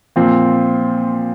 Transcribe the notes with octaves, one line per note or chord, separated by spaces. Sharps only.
A#2 F3 C4